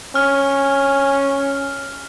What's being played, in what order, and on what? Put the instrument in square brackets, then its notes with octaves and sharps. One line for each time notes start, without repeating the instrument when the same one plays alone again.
[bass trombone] C#4 [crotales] F6